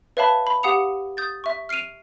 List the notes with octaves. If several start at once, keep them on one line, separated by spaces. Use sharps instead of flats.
B4 C#5 E5 F5 A5 B5
B5
G4 F5 F#5 D#6 C#7 F7
D#6 G6 A6
E5 C#6
F6 C7 D7 D#7 F7